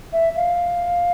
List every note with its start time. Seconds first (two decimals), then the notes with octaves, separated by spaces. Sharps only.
0.13 E5
0.36 F5